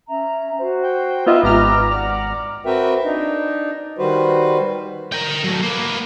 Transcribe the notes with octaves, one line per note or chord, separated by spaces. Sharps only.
C#4 E5 A#5
F#4 C5
G5
B3 D#4 F4 B4 D#5 E5
G#1 G4 A#5 F6
D5 F#5
C4 F#4 A#4 B4 E5 G5
D4 D#4
D#3 G3 F#4 B4 C5
A#4 G5
F#3 A3
A#3 B3